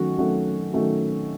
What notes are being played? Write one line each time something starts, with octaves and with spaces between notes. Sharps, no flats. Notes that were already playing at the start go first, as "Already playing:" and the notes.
Already playing: D#3 F#3 A3 C#4 F#4
D#3 F#3 A3 C#4 F#4
D#3 F#3 A3 C#4 F#4